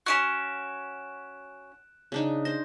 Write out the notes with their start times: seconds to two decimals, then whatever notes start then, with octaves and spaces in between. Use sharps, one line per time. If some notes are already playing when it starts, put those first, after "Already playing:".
0.06 C#4 D#4 F#4 F#6 D7 E7
2.12 C#3 D4 D#4
2.45 C5 A#6